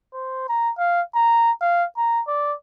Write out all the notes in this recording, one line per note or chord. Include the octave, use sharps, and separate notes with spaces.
C5
A#5
F5
A#5
F5
A#5
D5